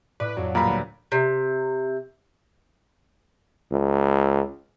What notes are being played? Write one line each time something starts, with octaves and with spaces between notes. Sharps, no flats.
A2 B4 D5
F2 F#3
A#2 G3 B4 D5 F5 A#5 B5
D2
C3
C#2